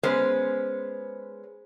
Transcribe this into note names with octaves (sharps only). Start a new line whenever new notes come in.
G#3 B3 C#4 C5